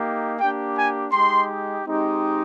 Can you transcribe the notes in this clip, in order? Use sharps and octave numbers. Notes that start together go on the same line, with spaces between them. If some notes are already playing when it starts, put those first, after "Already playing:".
Already playing: A#3 D#4 G4
A#3 D4 G4 G5
G#5
G#3 D#4 G4 C6
G#3 C4 D#4 G4